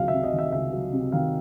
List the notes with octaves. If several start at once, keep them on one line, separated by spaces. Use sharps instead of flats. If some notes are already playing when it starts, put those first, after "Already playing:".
Already playing: C#2 C3 D#3 F#3 F5
E5
C3
D#5
D#3
E5
C#2 E5
F#3
C3
D#3 F5